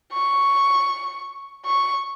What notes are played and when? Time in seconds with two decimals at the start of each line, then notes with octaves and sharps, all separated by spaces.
0.13 C#6
1.65 C#6